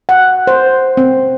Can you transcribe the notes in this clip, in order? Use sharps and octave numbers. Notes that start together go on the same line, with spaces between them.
F#5
C5
C4